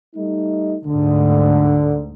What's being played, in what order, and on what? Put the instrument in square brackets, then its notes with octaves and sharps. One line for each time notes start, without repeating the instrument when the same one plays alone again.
[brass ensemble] G3 A3 D#4
[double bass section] D2 G#2 [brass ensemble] D3